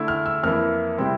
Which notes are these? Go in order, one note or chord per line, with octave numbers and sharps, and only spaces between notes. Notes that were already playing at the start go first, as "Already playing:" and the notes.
Already playing: D3 A3 E4
F6
E6
F2 E3 A#3 E4 F6
C3 G3 C4 E4